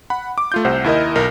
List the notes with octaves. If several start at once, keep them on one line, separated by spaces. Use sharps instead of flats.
F#5 B5
D6
A3 F4 G6
C2 C3 C5 F#5
D#2 E4 A#4 D#5
B1 A#4